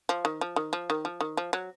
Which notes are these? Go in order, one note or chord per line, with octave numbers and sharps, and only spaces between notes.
F3
D#3
F3
D#3
F3
D#3
F3
D#3
F3
F#3